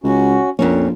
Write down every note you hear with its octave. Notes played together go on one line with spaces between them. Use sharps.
C#2 C#4 F#4
A#1 F2 A#2 A#3 C#4